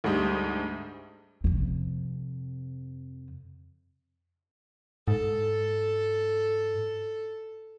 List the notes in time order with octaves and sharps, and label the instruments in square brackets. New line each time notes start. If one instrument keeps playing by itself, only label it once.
[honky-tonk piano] D2 G#2 G3 D#6
[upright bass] F2 C3
[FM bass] G#2 [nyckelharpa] A4